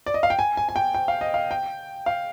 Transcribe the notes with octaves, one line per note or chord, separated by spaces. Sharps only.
D5
D#5
F5
G5
G#5
G#5
G#5
G5
G5
F5
D#5
F5
G5
F5